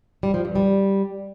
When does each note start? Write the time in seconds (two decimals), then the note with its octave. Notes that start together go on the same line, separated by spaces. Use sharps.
0.23 G3
0.34 F3
0.45 G2
0.56 G3